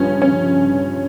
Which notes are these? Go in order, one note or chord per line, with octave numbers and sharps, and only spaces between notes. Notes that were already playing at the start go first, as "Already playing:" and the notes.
Already playing: G2 F3 C#4
C#4